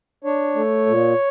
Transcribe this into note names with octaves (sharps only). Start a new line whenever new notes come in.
D4 C#5
A3
A#2